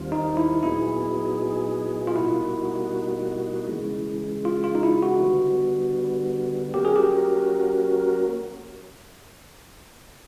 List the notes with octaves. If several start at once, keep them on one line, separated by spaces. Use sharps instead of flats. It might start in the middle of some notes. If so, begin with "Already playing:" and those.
Already playing: D#2 D#3 G3 C4 F4
D#4
E4
A#2 F#3 B3 D#4 E4 G#4
F4
B2 G3 A#3 D#4 E4 F#4
C#3 E3 G#3
F4
F4
D#4
E4
F#4
D3 G3 B3
F#3 A#3 C#4 F#4 G4 A#4
G#4
G4